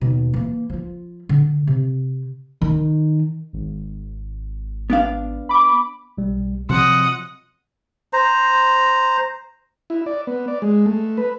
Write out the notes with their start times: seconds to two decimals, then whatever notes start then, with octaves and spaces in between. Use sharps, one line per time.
0.01 D#2 B2
0.34 E3 A#3
0.70 F3 F4
1.29 D3
1.67 C3
2.62 D#3
3.53 G#1
4.90 B3 D4 F5
5.49 B5 D6
6.18 B1 G3
6.69 C3 F3 F#3 D#5 F#5 C6
8.13 C5 A#5
9.90 E4
10.06 D5
10.27 B3
10.48 D5
10.62 G#3
10.86 A3
11.17 B4